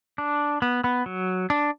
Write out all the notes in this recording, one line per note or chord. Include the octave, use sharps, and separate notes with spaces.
D4
B3
B3
F#3
D4